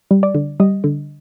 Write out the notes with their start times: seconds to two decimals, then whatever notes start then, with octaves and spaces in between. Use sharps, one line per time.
0.11 G3
0.23 D5
0.35 D3
0.60 G3 D#5
0.84 D3